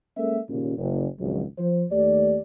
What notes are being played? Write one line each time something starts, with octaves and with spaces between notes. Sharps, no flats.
G#3 A#3 C#4 A4 A#4 E5
D#2 A#2 C#3
F#1
G#1 C#2 F3 F#3
F3 C5
D#2 A3 G4 D5